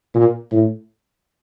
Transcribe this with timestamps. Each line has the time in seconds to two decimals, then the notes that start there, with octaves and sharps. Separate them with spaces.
0.15 A#2
0.52 A2